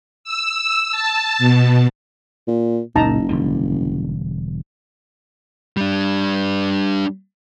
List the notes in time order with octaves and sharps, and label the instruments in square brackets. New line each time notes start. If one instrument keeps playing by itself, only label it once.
[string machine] E6
A5
B2
[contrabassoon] A#2
[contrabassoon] F#1 [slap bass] C#2 A#2 [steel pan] D#4 A5 A#5
[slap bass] E1 D3 G3
[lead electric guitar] G3 D4